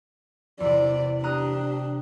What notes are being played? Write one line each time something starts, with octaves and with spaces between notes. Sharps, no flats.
E2 C3 D5
D4 G4 A#5 D#6 F#6